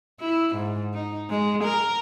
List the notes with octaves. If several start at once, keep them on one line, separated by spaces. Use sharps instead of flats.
E4
G#2
D#4
G#3
A#4